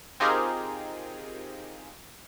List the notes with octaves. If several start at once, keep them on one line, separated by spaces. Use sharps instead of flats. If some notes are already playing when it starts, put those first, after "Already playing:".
C4 D#4 F4 G4 G#4 A#4